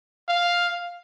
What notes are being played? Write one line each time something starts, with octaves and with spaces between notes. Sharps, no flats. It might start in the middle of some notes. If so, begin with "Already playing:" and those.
F5